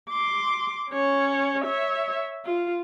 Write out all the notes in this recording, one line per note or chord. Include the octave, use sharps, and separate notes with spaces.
C6 D6
C#4 C#5
C#5 E5
F4